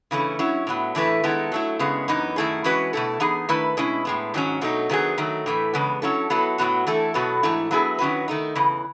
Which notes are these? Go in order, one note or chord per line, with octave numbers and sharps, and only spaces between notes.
C#3 E3 A3 C#4
F#3 C#4 E4
A2 F#3 B3
A2 E3 A3 E4 B4
D#3 G#3 B3 E4 A4
F#3 A3 E4
F#2 C#3 G#3 B3
F#2 E3 B3 D#4
F#2 D#3 A3 E4 G#4
E3 G#3 C#4 F#4 B4
B2 A3 E4 A4
E3 B3 D#4 G#4
D#3 A3 E4 B4
B2 G#3 C#4 E4
A2 G#3 B3
G#2 D#3 F#3 C#4
B2 F#3 A3 D#4
D#3 F#3 B3 E4 G#4
D#3 F#3 A3
A2 E3 A3
E2 C#3 G#3 B3
F#3 C#4 E4 A4
F#3 B3 E4 A4
A2 F#3 B3 F#4
E3 A3 E4 A4
B2 F#3 B3 F#4 A4
G#2 E3 A3 E4
F#3 B3 E4 G#4
D#3 F#3 C#4 F#4 B4
D#3 A3 D#4
E2 C#3 E3